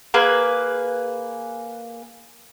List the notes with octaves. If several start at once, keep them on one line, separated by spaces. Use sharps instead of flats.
A#3 G#4 B4